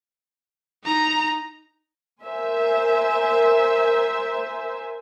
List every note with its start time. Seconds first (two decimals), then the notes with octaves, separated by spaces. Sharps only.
0.84 D#4 A#5
2.24 A#4 C5 E5 G#5